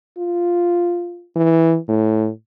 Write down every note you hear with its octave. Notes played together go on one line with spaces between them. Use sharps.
F4
E3
A2